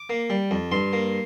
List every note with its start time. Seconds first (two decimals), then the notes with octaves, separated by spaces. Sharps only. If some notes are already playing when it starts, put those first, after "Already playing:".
Already playing: D6
0.10 A#3
0.30 G3
0.51 F2
0.72 G2 C6
0.93 A#3